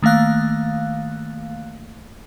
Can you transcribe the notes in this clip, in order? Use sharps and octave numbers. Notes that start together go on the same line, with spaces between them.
D#3 A3 A#3 F5 F#6